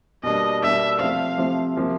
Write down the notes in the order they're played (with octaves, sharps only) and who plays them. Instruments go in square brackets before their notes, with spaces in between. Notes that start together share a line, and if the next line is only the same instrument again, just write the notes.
[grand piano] B2 G3 A#3 D4 [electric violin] D#5
[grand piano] B2 G3 A#3 D4 [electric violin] E5
[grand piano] C3 F3 A3 C4 [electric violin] F5
[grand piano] C3 F3 A3 C4
C3 F3 A#3